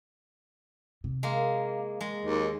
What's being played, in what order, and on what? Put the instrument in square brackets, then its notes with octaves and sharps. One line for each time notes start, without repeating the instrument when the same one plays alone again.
[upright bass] C3
[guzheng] G#3 A#3
G#3
[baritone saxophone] D#2